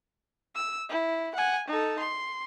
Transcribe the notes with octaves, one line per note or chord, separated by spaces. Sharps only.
E6
E4
F#5 G#5
D#4 A4
C6